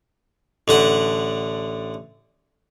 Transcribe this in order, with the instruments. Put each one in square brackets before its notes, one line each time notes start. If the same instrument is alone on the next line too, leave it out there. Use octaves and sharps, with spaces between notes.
[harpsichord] A1 D3 F#5